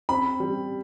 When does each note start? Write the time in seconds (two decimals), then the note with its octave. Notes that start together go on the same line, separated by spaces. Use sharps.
0.09 C4 B5
0.40 G3